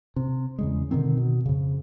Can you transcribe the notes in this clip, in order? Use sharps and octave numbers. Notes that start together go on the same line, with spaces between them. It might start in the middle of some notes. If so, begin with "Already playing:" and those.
C3
E2 C#3 G#3
B2 D3 D#3 C4
B2
F2 C#3